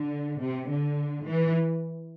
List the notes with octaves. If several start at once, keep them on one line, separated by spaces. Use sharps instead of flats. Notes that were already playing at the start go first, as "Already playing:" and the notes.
Already playing: D3
C3
D3
E3